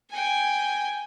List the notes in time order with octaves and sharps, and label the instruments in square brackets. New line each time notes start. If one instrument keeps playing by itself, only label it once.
[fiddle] G5 G#5